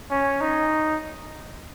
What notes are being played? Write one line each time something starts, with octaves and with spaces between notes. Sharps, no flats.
C#4
D#4